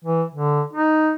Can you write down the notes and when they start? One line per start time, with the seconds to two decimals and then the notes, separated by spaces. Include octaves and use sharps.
0.04 E3
0.34 D3
0.73 D#4